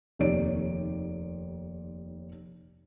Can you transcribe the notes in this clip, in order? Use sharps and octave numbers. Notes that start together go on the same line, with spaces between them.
F1 D#2 D#4 C#5 D5 D7